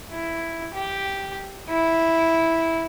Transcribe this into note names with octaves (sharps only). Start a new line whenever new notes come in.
E4
G4
E4